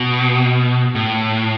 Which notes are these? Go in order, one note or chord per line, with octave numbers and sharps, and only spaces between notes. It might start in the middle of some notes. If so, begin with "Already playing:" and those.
Already playing: B2
A2